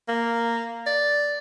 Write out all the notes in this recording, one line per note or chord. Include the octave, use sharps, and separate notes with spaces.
A#3
D5